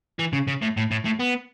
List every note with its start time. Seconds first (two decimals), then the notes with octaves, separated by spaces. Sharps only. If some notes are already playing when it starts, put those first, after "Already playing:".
0.19 E3
0.33 C#3
0.47 C#3
0.62 A2
0.77 A2
0.91 A2
1.05 A2
1.20 B3